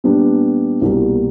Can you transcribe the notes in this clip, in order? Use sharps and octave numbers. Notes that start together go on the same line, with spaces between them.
A#2 G3 B3 D4 G4
C2 B2 G3 A#3